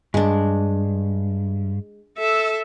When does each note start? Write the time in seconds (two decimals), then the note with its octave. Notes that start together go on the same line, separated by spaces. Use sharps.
0.14 G2 G#3 D4
2.18 A4 E5